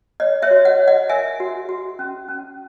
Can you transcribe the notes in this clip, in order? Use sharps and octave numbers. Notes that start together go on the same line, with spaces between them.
C#5 D#5
C#5 E5
F#4
D#5 F#5
C#5
D#5 F#5
A#4 E5 G#5
F#4
F#4
C#4
C#4